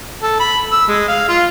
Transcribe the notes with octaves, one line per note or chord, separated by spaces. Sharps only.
A4
B5
E6
G#3
F5
F4